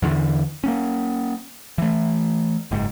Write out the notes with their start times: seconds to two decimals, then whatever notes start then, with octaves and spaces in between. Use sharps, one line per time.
0.02 E2 D3 E3
0.64 A#3 B3 C#4
1.78 E3 A3
2.71 F#1 G#2